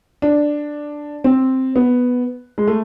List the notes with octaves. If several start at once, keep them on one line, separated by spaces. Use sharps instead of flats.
D4
C4
B3
G#3
A3